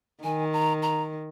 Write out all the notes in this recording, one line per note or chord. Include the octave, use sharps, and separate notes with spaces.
D#3 G#5
A#5
A#5